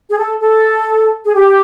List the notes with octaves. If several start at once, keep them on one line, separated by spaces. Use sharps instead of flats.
G#4
A4
A4
G#4
G4